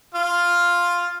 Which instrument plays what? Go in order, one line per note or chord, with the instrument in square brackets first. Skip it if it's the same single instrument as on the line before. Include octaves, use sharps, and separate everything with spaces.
[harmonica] F4 F6